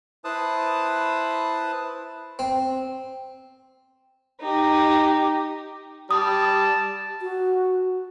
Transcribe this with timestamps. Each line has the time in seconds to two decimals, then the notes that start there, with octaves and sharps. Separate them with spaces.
0.24 E4 B4 C5 A5 D#6
2.39 C4
4.42 D#4 G4
6.11 G3 A5 D#6
7.22 F#4